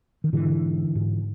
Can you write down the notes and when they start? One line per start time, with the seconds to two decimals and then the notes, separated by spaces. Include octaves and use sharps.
0.24 D#3
0.33 G#2 D3 E3
0.95 G#2